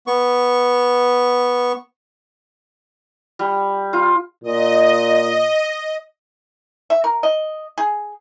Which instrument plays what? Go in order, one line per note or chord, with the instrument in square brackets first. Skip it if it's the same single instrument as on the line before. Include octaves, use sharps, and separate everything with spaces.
[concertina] B3 C#6
[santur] G3
F4
[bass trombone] A#2 [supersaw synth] D#5
[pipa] E5
A#4
D#5
G#4